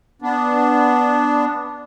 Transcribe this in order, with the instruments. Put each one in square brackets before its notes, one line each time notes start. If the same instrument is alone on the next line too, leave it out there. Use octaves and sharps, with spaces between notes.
[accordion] B3 D4